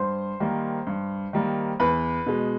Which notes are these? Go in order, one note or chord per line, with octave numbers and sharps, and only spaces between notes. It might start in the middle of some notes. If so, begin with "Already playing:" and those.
Already playing: G2 C5 C6
D#3 G3 A#3
G2
D#3 G3 A#3
E2 B4 B5
B2 G#3